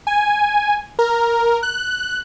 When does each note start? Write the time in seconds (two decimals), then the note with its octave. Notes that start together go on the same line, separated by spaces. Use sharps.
0.07 G#5
0.99 A#4
1.63 F#6